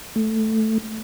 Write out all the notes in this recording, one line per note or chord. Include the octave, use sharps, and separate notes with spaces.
A3